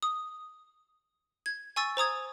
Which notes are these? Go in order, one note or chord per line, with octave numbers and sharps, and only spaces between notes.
D#6
G#6
G#5 C#6 E6 A6
C5 A#5 D#6 G#6